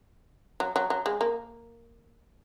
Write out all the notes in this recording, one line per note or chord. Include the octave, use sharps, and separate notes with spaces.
F#3
F#3
F#3
G#3
A#3